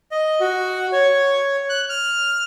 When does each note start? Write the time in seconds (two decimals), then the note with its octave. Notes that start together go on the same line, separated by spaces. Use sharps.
0.11 D#5
0.40 F#4
0.92 C#5
1.69 F#6
1.89 F6